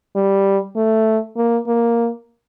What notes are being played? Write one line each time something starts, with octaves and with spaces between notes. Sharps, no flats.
G3
A3
A#3
A#3